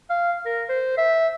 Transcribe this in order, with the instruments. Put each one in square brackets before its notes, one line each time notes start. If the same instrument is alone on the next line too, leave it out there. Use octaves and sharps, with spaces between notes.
[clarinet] F5
A#4
C5
E5